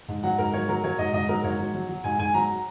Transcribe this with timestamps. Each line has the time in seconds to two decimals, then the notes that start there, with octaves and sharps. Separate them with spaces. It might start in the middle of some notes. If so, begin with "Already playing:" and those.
0.08 G#2
0.23 F#3 F#5
0.38 G#2 A#4
0.54 F#3 C#5
0.68 F#3 A#4
0.84 F#3 C#5
0.99 G#2 D#5
1.13 G#2 D#5
1.29 F#3 A#4
1.44 G#2 C#5
1.59 F#3
1.74 F#3
1.89 F#3
2.04 G#2 G#5
2.19 G#2 G#5
2.34 F#3 A#5